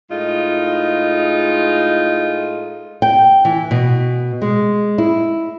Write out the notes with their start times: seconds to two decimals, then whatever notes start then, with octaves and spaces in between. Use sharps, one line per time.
0.12 A2 G#3 D#4 F4
3.02 G5
3.45 E3
3.71 B2
4.42 G#3
4.98 E4